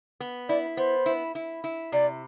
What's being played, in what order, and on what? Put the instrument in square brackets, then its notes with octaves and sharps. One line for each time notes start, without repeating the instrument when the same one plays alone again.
[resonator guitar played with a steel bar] B3
[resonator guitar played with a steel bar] E4 [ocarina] D5
[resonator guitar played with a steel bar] B3 [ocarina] C5
[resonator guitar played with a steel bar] E4
E4
E4
[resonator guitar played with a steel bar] C3 [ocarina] D5